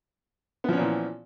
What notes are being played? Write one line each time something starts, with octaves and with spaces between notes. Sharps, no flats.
A#2 E3 F3 B3 C#4